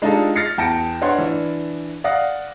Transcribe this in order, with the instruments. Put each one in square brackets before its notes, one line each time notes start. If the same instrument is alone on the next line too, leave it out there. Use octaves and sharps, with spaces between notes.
[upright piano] G#3 D4 D#4 F4 G4 A4
F6 A6 A#6 C7 C#7
E2 G5 A5 A#6 C#7 D7
D4 B4 C#5 F#5 C6
E3 D4
D5 F5 F#5 D#6 A#6